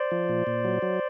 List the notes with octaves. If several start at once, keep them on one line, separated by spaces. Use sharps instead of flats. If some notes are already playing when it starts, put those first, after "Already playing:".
Already playing: C5 D5
F3
A#2
A#2
F#3
F#3